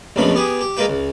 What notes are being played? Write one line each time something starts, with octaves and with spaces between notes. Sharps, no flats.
A#1 F#2 B2 F3 A3 B5
B3 G4 G#4
G4
G#3 A#3 F4 B4 G5
C#2